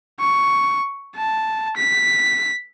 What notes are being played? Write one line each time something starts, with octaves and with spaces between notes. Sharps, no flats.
C#6
A5
B6